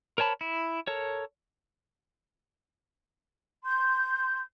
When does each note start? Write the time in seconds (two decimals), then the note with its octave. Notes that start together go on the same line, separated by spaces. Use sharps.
0.18 A#4 C5 C#5 A5 B5
0.41 E4
0.87 A4 A#4 C#5
3.65 C6 G6